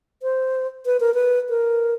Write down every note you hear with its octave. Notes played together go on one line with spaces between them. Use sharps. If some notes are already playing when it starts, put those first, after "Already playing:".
C5
B4
A#4
B4
A#4